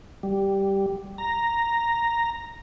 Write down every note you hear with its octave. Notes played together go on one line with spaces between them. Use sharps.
G3
A#5